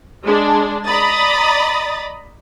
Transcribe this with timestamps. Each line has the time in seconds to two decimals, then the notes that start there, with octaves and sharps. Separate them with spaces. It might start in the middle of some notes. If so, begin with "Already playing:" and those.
0.24 G#3 D4
0.86 D5 D#5 A#5 B5 D#6 A6